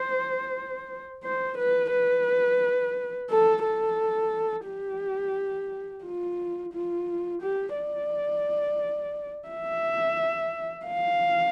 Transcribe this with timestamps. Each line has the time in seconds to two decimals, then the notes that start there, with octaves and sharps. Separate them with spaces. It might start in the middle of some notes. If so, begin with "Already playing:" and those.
Already playing: C5
1.24 C5
1.58 B4
1.92 B4
3.30 A4
3.64 A4
4.67 G4
6.05 F4
6.73 F4
7.42 G4
7.77 D5
9.49 E5
10.86 F5